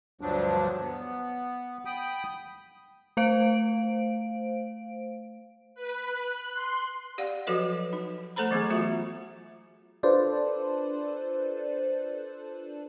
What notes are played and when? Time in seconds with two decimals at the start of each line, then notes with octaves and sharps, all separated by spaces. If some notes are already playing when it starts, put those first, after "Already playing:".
0.21 D2 G2 F3 F#3 D4
0.82 B3
1.85 G5 B5 D#6
3.17 A3 C5 F5 D7
5.75 B4
6.15 F#6
6.53 C6
7.18 G4 D5 F5 F#5
7.47 F3 F#3 F#4 A4 B4 D#5
7.93 D#4
8.36 A3 A4 C5 A#5 B5
8.51 E3 F#3 B3 G#4
8.70 A3 F4 F#4 E5
10.03 D4 F4 A4 B4 C5 D5